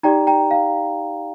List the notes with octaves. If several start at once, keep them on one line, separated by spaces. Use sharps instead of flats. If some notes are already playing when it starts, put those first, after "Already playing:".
D#4 G4 D5 G5 A#5
G5 A#5
F5